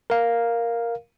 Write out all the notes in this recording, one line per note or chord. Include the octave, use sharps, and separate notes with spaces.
A#4 F5